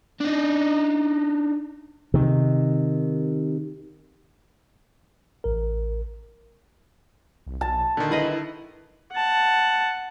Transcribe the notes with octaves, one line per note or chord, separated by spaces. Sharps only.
D4 D#4
C3 D#3
A1 A#4
C2
B1 A5
A#2 D3 D#3
E4 G#4 B4 D#5
F#5 A5